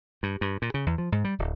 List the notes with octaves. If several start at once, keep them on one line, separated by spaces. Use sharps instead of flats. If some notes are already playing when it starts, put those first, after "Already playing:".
G2
G2
A#2
C#3
E2
F3
G#2
G3
D1